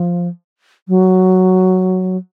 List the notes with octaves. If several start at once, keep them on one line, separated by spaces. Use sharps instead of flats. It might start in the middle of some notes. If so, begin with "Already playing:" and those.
Already playing: F3
F#3